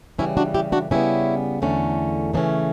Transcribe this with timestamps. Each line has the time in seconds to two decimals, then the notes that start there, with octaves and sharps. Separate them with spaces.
0.18 C#3 E3 G3 C#4 E4
0.37 D4 F#4
0.54 E4 G4
0.72 D4 F#4
0.91 C#3 G3 B3 C#4 E4
1.62 E2 D3 A3 C#4
2.34 C#3 E3 A3 C#4 D4